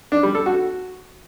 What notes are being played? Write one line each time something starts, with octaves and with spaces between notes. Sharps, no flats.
D4
G3
A4
F#4